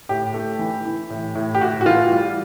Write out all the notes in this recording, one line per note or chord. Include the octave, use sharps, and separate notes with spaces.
A2 G4
A3
E3
E3
A2
A2
G4
A2 F#4
F#4
E3 F4
G3